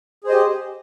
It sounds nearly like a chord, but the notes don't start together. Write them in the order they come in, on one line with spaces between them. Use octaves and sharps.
G#4 C5 D#5 G4